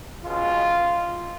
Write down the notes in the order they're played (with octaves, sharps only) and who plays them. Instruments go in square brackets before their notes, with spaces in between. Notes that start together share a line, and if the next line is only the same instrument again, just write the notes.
[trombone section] C#2 B2 G#3 F4